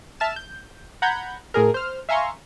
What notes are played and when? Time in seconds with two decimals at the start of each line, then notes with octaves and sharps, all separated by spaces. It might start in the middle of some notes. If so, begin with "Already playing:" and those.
0.20 E5 A5 F6 E7
0.36 G6
1.02 F#5 A#5 B5 G6 G#6
1.54 A2 G#4 A#4
1.74 C5 F6
2.09 E5 F5 G#5 A#5 C6 C#6